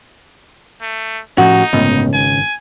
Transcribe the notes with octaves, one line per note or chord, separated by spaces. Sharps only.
A3
A2 F3 C#4 D#4 F#4
G1 C#2 A2 B3
G#1 G#5